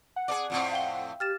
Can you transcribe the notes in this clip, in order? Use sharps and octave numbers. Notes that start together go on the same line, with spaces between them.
F#5
G#4 A#4 D5 D6
F2 A2 C4
F5 G5 G7
G4 F6 A6 E7